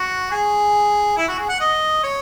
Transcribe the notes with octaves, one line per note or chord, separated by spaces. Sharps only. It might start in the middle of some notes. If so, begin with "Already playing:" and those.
Already playing: F#4
G#4
E4
F#4
G#4
F#5
D#5
C#5